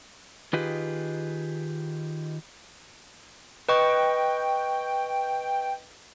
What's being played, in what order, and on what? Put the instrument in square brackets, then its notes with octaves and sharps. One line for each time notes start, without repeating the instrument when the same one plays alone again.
[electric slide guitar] D#3 F4 G4 G#4 B4 D#5
[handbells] B4 D#5 C#6 [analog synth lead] G5